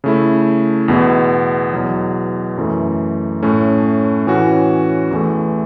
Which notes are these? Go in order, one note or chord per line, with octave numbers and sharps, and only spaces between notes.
C#3 A3 E4
E2 B2 B3 E4
E2 B2 F#3
F#2 E3 A3
A2 A3 C#4
A2 E3 C#4 F#4
E2 E3 A3